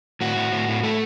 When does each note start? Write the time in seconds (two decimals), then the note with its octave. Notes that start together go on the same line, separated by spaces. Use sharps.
0.21 A2 F#4
0.36 A2
0.52 A2
0.68 A2
0.83 A2 A3